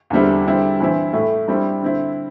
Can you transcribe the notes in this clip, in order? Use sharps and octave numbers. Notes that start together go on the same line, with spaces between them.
E2 D3 G3 C4 E4
D3 G3 C4 E4
G2 E3 C4 E4
A2 A3 E4
G2 G3 C4 E4
D3 C4 E4